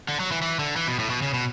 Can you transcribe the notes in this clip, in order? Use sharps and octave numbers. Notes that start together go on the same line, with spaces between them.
D3
F#3
E3
E3
D3
E3
B2
A2
B2
C#3
B2